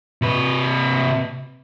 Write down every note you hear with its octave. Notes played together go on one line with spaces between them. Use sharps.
C3 B4